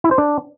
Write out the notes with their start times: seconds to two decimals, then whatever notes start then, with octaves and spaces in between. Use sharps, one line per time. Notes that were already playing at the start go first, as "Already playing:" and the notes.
0.04 E4
0.11 C5
0.18 D4